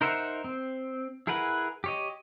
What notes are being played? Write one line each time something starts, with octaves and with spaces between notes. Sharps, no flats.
D#4 A#4 C5 E5 F#5
C4
E4 G#4 A#4 B4 F#5
G4 C#5 D#5